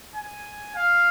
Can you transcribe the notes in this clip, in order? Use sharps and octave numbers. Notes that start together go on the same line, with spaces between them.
G#5
F5